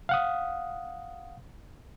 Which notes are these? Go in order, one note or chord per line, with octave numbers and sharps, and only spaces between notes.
F5 F#5 D#6